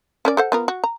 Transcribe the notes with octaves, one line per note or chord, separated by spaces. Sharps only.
C#4 A#4 D5
A4 C5 F#5
B3 F4 A#4
F#4
A#5